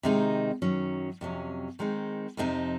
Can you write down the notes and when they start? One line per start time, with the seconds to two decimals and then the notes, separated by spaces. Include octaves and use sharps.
0.03 C3 D#3 G#3 C4 D#4
0.62 F#2 D#3 F#3 C#4
1.21 F2 C3 F#3 C#4
1.79 D#3 G#3 C4 D#4
2.37 F2 C3 F3 C4 D#4